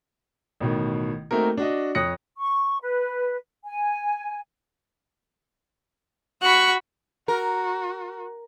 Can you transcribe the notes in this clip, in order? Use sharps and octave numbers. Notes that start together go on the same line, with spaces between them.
A1 B2 D#3
A3 A#3 C4 D#4 F#4 A#4
D4 F#4 D#5
F2 C#5 D#6 F#6 A#6 C#7
C#6
B4
G#5
F#4 B5 C#6 F#6
F#4 A#4